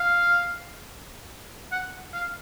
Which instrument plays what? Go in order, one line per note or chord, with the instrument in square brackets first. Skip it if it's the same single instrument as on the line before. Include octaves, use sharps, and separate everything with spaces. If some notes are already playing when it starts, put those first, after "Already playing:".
Already playing: [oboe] F5
F#5
F5